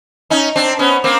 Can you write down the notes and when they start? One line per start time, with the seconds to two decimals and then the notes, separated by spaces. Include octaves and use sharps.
0.30 C#4 D#4
0.56 C4 D4
0.79 B3 C#4
1.04 A#3 C4